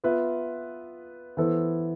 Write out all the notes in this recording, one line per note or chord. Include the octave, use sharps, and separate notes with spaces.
B3 F4 B4 E5
E3 B3 E4 A4 C5